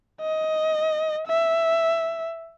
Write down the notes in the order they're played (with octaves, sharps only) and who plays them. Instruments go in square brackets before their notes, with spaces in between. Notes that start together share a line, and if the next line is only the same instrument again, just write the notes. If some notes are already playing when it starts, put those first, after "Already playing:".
[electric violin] D#5
E5